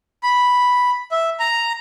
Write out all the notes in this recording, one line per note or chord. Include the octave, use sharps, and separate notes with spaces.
B5
E5
A#5